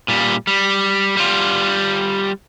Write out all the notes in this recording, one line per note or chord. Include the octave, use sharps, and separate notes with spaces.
A#2 G3
G3
G3 F4